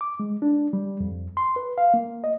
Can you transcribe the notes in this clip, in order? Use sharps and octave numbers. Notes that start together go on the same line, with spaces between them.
D6
G#3
D4
G3
F2
C6
B4
F5
A#3
D#5